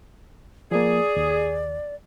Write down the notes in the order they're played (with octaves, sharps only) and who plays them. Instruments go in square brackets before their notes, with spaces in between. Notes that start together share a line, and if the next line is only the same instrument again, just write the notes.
[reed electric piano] F3 A#3 [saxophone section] G#4 [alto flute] D5
[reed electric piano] D#2